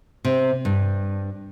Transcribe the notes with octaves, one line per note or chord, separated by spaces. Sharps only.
C3
G2